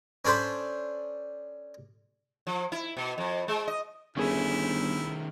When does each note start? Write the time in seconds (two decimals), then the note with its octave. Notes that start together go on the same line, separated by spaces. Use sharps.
0.25 C#4 D4 A4 C5 B5
2.47 F3
2.72 E4
2.97 B2
3.18 F2
3.48 G#3
3.68 D#5
4.17 G1 D#3 A3 C#4 E4 G#4 E7